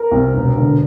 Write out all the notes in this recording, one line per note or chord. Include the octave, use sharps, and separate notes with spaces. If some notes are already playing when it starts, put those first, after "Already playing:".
Already playing: A#4
C2
E1
D3